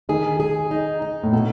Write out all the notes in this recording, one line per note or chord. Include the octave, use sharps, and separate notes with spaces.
D#3 G#4
G#4
D#4
D#4
A2
B2 A4